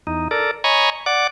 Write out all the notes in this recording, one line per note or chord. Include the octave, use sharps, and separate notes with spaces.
E2 D#4
A4 A#4 D5
C#5 D#5 G#5 A#5 B5 C#6
D5 F#5 D6